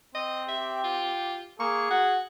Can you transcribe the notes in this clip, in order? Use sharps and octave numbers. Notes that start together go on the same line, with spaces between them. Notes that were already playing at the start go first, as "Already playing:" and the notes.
C4 D#5
G4 E5
F4
A#3 G#4 C#6
F#4 F#5